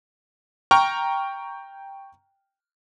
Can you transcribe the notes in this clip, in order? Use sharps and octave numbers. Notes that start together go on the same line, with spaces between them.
G5 A#5 C#6 F6